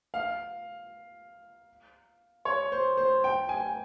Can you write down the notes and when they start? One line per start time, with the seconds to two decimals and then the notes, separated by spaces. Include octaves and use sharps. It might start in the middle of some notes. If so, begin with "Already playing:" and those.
0.14 F5
2.45 C#5
2.72 C5
2.97 C5
3.24 G5
3.49 G#5